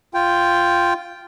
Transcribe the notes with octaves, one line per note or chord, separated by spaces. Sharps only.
F4 G5